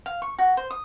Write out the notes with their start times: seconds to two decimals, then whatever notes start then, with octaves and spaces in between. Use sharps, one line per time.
0.06 F5
0.22 C#6
0.38 F#4
0.57 C5
0.71 D#6